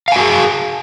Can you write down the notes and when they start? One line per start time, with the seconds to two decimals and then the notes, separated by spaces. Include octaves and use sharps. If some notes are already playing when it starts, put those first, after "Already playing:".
0.08 F5
0.12 G#5
0.16 F#4
0.20 G#4